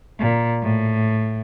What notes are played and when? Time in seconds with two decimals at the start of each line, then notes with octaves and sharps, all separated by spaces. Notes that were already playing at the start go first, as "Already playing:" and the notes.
0.19 A#2
0.63 A2